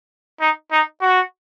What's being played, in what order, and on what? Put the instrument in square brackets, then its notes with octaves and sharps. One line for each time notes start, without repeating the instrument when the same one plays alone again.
[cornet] D#4
D#4
F#4